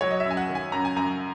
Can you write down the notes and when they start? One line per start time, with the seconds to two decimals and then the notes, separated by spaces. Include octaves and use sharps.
0.01 F#3 C#5
0.11 D#5
0.20 E5
0.25 F#2
0.30 G#5
0.37 F#5
0.49 D#3
0.55 G#5
0.72 F#2 A#5
0.85 G#5
0.96 F#2 A#5